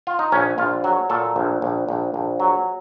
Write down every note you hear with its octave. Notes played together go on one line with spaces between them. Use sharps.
F4
D#4
A#1 C#4
A#1 F4
F#3 F#4
A#2 A4
A#1
A#1
A#1
A#1
F#3